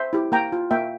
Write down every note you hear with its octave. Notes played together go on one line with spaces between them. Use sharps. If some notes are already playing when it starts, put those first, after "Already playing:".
Already playing: C5 E5
E4 G4
A#3 G5 A#5
F4
A#3 E5 G5